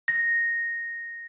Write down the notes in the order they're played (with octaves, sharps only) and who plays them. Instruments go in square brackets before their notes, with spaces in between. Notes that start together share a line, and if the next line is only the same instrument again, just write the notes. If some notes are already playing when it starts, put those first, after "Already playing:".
[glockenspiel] A#6